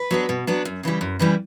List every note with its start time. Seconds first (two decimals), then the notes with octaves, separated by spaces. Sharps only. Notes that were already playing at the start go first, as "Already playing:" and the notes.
Already playing: B4
0.11 F#3 B3 D4
0.29 B2
0.47 F#3 B3 D4
0.65 F#2
0.83 C#3 E3 G3
1.01 F#2
1.19 C#3 E3 G3